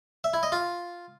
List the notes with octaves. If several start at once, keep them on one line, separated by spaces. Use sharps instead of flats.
E5
E4
D#5
F4